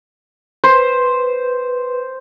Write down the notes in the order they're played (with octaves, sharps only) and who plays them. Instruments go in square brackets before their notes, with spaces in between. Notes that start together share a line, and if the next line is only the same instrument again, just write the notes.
[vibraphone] B4 [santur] C5